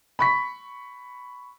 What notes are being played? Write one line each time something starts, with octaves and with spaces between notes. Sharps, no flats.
B5 C#6 B6